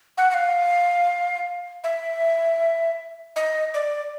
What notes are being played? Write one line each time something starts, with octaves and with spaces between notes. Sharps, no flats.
F#5
F#5
F5
E5
D#5
D5